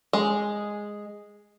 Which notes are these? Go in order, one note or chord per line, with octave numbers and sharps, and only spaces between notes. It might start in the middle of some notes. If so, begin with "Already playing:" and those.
G#3